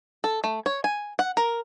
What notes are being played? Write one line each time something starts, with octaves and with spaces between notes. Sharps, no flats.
A4
A3
C#5
G#5
F#5
A#4